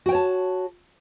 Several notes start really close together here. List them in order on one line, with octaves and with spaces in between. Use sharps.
F#4 G5 C#5 A5